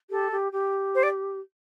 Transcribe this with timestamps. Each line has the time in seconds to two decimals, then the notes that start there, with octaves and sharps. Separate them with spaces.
0.10 G4 A4
0.31 G4
0.52 G4
0.94 C5
1.03 D5